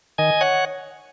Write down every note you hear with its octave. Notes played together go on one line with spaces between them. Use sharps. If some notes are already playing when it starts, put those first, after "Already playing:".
D#3 D#5 G#5
C#5 F#5